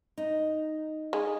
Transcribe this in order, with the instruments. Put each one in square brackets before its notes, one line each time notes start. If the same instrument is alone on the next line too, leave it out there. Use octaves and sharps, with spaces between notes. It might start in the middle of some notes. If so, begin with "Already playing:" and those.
[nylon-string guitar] D#4
[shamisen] G#3